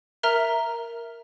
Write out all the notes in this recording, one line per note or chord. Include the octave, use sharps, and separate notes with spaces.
A#4 E5 A#5 F6